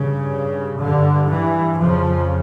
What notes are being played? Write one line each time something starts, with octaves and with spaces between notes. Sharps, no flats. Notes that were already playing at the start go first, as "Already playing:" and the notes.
Already playing: G2 C#3
G2 D3
E3
F2 C#3 F3